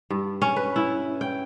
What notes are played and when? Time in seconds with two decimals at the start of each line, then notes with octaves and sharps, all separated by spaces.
0.10 G2
0.42 C#4
0.56 B4
0.76 E4
1.21 G5